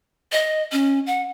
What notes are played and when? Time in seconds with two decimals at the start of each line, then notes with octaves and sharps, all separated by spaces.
0.32 D#5
0.72 C#4
1.07 F#5